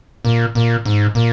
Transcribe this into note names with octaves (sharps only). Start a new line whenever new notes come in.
A#2
A#2
G#2
A#2